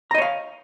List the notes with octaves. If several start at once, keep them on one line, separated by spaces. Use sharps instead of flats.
C#5 D#5 F5 A#5